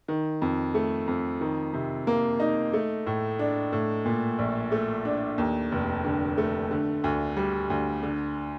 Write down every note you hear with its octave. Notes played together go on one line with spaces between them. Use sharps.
D#3
F2
A3
F2
D#3
C3
A#3
D#4
A3
A2
D4
A2
A#2
A#1
A3
D4
D#2
F1
D3
A3
D3
D2
G3
D2
D3